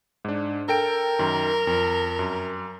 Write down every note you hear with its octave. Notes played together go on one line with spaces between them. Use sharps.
G#2 D4
A4 A#4 G5 D7
F#2 D#3
F2
F#2